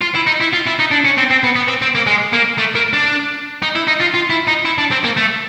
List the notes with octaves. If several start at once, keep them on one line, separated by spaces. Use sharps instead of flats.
F4
E4
D#4
E4
F4
E4
D#4
D4
C#4
C4
C4
B3
B3
C4
C4
A#3
G#3
A#3
A3
A#3
D4
D#4
E4
D#4
F4
F4
E4
D#4
E4
D4
C4
A#3
A3